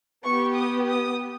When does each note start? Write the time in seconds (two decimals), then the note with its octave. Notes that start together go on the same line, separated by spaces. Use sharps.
0.24 B3 G4 C#6
0.55 D#6
0.86 D#6